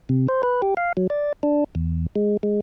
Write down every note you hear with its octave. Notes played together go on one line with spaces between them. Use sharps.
C3
C5
B4
G4
F5
F#3
D5
D4
E2
G#3
G#3